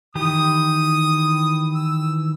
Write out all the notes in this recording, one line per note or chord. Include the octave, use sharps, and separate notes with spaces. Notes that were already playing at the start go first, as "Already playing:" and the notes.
D#3 E3 G4 D#6
E6